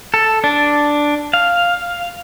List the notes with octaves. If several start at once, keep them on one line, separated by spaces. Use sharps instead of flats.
A4
D4
F5